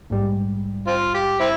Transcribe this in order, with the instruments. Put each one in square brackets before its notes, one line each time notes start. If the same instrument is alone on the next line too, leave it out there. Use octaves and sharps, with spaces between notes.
[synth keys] A#1 G#2 G3
[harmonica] C4 F4
G4
C4 E4